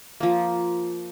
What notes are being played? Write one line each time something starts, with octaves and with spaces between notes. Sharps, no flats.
F3 A#3